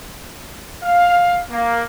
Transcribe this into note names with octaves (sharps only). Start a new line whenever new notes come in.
F5
A#3